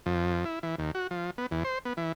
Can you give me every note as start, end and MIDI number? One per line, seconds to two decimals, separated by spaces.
0.06 0.45 41
0.45 0.59 64
0.63 0.75 52
0.79 0.91 39
0.95 1.07 66
1.11 1.31 53
1.38 1.46 59
1.51 1.64 40
1.64 1.79 72
1.85 1.93 59
1.97 2.12 52